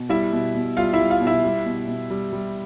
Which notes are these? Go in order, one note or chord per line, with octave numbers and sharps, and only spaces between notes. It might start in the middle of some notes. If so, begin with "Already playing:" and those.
Already playing: B2
G3 E4 E5
B2
B2
G3 F4 F5
E4 E5
G3
F4 F5
B2
E4 E5
G3
B2
B2
G3
G3